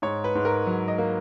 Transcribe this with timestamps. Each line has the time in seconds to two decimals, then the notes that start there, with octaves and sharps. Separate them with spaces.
0.02 G#2 C#5
0.24 B4
0.35 G#2
0.45 A#4
0.67 F#3
0.88 D#5
0.98 A#3